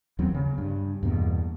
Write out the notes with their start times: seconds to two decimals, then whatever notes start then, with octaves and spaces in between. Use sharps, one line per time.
0.19 D#2 F#3 B3 C4
0.34 C#3
0.58 G2
1.03 E2 G2 B2 A#3